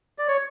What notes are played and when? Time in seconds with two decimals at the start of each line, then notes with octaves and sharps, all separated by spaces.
0.18 D5
0.28 C#5